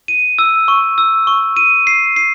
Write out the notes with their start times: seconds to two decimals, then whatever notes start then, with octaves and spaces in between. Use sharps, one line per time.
0.08 D#7
0.39 E6
0.68 C#6
0.98 E6
1.27 C#6
1.57 D#7
1.87 C7
2.16 C7